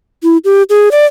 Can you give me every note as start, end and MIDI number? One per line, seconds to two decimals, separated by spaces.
0.23 0.37 64
0.45 0.63 67
0.70 0.89 68
0.92 1.06 74